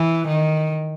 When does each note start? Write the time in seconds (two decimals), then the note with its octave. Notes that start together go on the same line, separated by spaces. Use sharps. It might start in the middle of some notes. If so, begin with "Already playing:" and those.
Already playing: E3
0.28 D#3